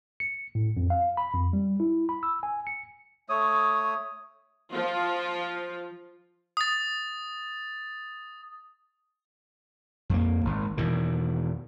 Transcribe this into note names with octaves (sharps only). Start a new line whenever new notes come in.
C#7
A2
F2
F5
B5
F2
G3
E4
B5
E6
G#5
C#7
A3 C#5 D#6
F3 F4
D#6 A6
F2 A#3
G#1
E2 B2 D#3